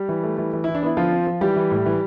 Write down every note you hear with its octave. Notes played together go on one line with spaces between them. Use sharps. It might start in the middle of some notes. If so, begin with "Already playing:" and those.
Already playing: G3 G4
E3
A3
E3
E3
E3 E4
D4
B3 E4
D3 F3 F4
C4
F3
E3 G3 G4
E3
A2
E3